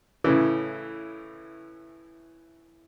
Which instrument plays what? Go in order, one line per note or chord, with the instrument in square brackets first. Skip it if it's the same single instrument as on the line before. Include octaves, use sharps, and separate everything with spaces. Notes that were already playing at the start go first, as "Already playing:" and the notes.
[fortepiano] A2 C#3 E3